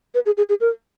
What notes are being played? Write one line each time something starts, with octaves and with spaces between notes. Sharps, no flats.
B4
G#4
G#4
G#4
A#4